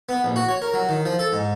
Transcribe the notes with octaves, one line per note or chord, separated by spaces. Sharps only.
B3
A#1
F#4
C#5
A#4
F#3
D#3
F3
A4
G#2